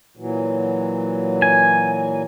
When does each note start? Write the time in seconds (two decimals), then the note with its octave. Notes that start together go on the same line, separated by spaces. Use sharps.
0.17 A#2 E3 F#3
1.42 G#5